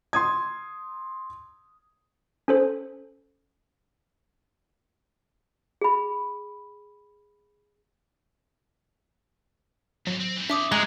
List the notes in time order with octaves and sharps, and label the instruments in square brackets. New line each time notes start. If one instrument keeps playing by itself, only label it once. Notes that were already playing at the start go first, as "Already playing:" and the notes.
[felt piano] C6 D#6 G#6
[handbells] C#4 A4 C5
[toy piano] G#4 B5
[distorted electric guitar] G#2 E3 [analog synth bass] F#3
[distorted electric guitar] C4
E3 C4
[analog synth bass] D4 [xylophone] E5 D6 D#6
[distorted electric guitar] G#2 C4 [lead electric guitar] G#3 [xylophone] A#5 F#6 F7